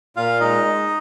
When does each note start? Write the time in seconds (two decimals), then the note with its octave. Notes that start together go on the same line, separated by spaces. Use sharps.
0.16 A#2 F4 F5
0.40 G#3 D#4 D#5
0.65 G#3